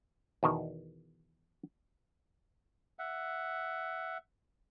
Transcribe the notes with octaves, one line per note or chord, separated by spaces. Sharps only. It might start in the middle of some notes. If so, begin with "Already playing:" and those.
E2 B2 D#3
E5 F#5